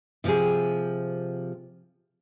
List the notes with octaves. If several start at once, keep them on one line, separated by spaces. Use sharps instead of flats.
C3 F3 C4 G4 G#4